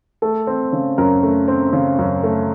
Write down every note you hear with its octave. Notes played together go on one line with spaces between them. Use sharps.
A3 A4
C4
C#3
F#2 A#4
A3
C4
C#3
F#2
A3